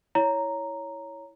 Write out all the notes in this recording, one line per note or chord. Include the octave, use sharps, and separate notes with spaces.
E4 C#5 A#5